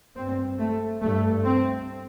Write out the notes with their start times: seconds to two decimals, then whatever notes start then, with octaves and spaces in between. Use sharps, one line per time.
0.15 G2 C4
0.58 A3
1.01 G2 A3
1.43 C4